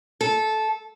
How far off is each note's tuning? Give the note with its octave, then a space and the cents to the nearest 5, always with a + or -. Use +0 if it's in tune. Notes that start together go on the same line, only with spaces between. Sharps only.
A4 -15